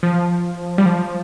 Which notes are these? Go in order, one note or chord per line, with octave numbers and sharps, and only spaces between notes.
F3
G3
F3